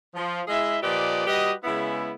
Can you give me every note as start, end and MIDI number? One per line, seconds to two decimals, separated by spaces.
0.15 0.42 53
0.47 0.77 56
0.47 0.77 64
0.47 0.77 68
0.47 0.77 75
0.47 0.77 76
0.82 1.24 46
0.82 1.24 53
0.82 1.24 67
0.82 1.24 71
0.82 1.24 74
0.82 1.24 75
1.27 1.52 55
1.27 1.52 66
1.27 1.52 67
1.27 1.52 71
1.27 1.52 75
1.64 2.13 49
1.64 2.13 56
1.64 2.13 59
1.64 2.13 64